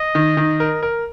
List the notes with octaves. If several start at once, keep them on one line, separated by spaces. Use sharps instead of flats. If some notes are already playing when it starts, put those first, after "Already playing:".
Already playing: D#5
D#3
D#3
A#4
A#4